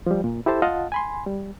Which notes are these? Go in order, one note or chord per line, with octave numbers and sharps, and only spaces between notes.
F3 G3
A#2
E4 G4 A4 C5 A5
F4 D#5 F5 F#5 A5
G#5 B5 C6
G3